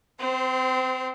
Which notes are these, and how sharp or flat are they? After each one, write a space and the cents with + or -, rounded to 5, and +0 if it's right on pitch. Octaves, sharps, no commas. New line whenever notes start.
C4 -25 C5 +0